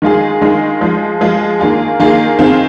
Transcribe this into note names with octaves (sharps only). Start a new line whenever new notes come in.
D#3 G#3 F4 G#4
D#3 G#3 F4 G#4
F3 G#3 F4
F3 G#3 F4
D#3 A#3 F4 G#4
D#3 A#3 F4 G#4
D#3 C4 F4 G#4